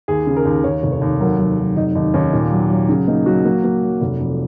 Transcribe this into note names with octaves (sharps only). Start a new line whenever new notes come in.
D#2 G#4
C#3
A#4
D#2
D#2 C#5
F1
C#5
D#2
F#3 A#4
F#3
F#3
F1 D#4
D#2 D#4
D#2 C#4
A#2
F#3
F#3
C#3
A#3 D#4
F#3 F#4
A#3
A#3
F#3
F1
F2